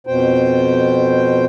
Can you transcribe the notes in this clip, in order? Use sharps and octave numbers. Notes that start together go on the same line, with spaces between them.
F2 B2 C5 G5